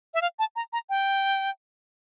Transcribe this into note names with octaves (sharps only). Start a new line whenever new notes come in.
E5
F5
A5
A#5
A#5
G5